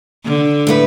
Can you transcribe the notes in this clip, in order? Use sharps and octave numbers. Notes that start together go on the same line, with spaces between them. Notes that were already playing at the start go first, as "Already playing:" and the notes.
D3
A2 A3 E4 B4